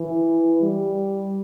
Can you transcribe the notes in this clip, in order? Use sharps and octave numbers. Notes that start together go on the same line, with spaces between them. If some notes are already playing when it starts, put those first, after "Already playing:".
Already playing: E3
G3